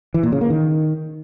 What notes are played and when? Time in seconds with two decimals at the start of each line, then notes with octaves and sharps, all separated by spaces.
0.14 E3
0.23 A#2
0.32 C#3
0.41 A#3
0.50 D#3